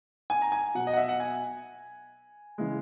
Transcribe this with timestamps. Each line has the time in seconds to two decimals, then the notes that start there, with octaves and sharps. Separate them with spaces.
0.30 G#5
0.42 A#5
0.52 G#5
0.75 B2 F#3 F#5
0.87 D#5
0.93 F#5
0.97 E5
1.09 F#5
1.20 G#5
2.58 C#3 E3 G#3